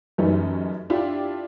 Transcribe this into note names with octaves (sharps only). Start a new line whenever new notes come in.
F#2 E3 G3 A3 C#4 D#4
D4 E4 F4 G4